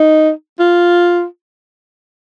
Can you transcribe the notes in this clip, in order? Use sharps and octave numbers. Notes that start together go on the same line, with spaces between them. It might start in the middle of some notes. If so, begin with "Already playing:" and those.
Already playing: D#4
F4